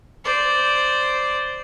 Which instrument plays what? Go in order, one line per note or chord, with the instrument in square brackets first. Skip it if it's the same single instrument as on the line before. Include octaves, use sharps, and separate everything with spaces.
[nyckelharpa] C5 D5